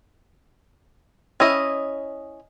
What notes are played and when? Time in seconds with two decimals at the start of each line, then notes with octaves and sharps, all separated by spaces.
1.40 C#4 E4 D#5